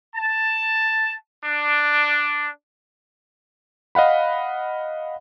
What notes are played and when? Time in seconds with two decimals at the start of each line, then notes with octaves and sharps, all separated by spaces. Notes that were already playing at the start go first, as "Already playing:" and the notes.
0.16 A5
1.45 D4
3.95 D#5 F5 F#5 B5